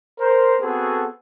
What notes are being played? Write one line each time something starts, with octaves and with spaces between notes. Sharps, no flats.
A#4 C5
B3 C4 F#4 G#4 A4